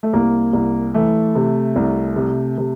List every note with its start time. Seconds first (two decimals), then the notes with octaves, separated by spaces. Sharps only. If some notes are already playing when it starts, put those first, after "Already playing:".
0.03 A3
0.13 C2 A#3
0.53 C2
0.94 E3 A3
1.35 C3
1.76 C2
2.16 C3
2.58 C3